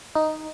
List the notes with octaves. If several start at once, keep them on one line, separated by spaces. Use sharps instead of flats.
D#4